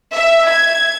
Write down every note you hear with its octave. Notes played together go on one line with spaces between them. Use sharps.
E5
G#6